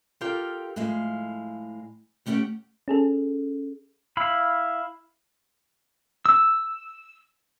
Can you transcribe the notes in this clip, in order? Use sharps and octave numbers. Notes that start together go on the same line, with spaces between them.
F4 G4 A4 A#4 F5 G5
A2 F3 G#3 F5
D#2 A3 C#4 G4 F#5 G5
C#4 G#4 A4
E4 F5 B5
E6